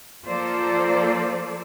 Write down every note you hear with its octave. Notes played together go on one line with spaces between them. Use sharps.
F3 A#3 F4 A4 C5 D5